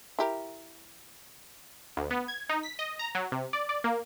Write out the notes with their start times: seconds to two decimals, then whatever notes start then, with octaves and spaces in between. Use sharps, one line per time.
0.19 E4 G4 A#4
1.97 D2
2.11 B3
2.28 G#6
2.49 D#4
2.63 B6
2.79 D#5
2.99 A#5
3.15 F#3
3.32 C3
3.53 D5
3.69 D5
3.84 A#3